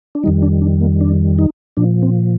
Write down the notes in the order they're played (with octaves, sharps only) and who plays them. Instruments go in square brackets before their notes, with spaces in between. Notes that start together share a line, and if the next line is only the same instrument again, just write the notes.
[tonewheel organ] D4
F2 D#3 G3 D#4
D4
D4
A#3
D4
D#4
A#2 F3 D4
C4